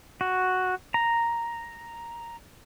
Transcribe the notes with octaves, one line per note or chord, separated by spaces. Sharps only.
F#4
A#5